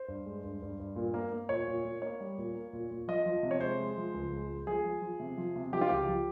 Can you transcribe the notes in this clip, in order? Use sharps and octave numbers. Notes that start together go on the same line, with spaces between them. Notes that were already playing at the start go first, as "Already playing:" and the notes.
Already playing: C5
G2
G#3
G2
G2
G2
A#2
A#3
A#3
A#2 C#5
A#2
A#2
A#3 C#5
G3
A#2
A#3
A#2
A#2
F3 D#5
F3
C3
C#5
G#3 C5
G#3
F3
C#2
G#3
G#3
F3 G#4
F3
F3
C3
F3
C3
F3 G4
F4
C#2 G4
F3